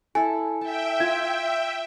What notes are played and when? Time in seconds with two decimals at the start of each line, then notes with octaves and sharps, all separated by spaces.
0.15 E4 A4 G#5
0.61 E5 G5 A5
1.00 F4 G#6